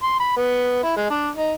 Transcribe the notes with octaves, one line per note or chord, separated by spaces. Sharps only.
C6
B5
B3
E4
G#3
D4
D#4